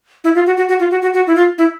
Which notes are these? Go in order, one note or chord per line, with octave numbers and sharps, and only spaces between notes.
E4
F4
F#4
F#4
F#4
F4
F#4
F#4
F#4
E4
F4
E4